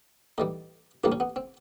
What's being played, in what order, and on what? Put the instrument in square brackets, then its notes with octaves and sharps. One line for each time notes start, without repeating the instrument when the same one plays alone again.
[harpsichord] A2 E3 G3 D#4
A1 A2 E3 G3 A#3 D4
C#4
B3
C4